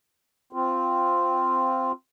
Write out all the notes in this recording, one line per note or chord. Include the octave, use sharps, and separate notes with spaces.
C4 F4